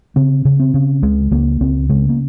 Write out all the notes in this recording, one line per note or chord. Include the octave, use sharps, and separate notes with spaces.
C#3 C4
C#3
C4
C#3
C#2 G#3
C#2 A#3
C#2 C4
C#3 G#3
A#3